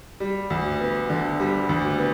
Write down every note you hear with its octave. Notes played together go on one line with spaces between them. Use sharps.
G3
D2
B3
D3
G3
D2
B3